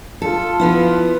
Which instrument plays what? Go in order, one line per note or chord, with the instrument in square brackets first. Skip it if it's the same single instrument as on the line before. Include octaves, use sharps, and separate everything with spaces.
[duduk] F4 [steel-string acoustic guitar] A4
[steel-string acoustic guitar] F3 B3 E4